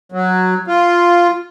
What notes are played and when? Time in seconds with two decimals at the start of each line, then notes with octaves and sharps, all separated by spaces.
0.12 F#3
0.68 F4